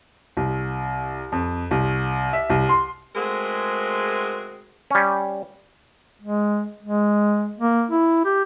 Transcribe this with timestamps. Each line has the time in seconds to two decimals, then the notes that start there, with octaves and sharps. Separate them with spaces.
0.37 C2
1.32 F2
1.71 C2
2.33 E5
2.50 C2
2.69 C6
3.15 G#3 A3 C4 F#4 G#4 A#4
4.91 G3 C#4
6.22 G#3
6.83 G#3
7.59 A#3
7.91 E4
8.25 G4